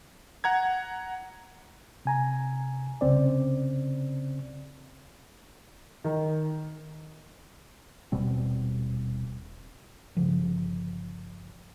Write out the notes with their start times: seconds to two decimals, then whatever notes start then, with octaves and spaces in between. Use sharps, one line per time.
0.44 F#5 A#5 G#6
2.05 C3 G#5 A#5
3.01 C2 C#3 C4 D5
6.04 D#3
8.12 D#1 B2 G3 C4
10.17 G1 C#3 F3